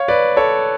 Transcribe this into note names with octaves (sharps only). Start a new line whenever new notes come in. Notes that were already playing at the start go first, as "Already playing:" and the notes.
Already playing: C#5 F5
B4 D5
A4 C#5